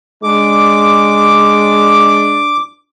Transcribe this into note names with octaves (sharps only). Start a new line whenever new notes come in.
G#3 D4 D6